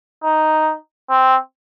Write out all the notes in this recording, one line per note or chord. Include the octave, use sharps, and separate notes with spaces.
D#4
C4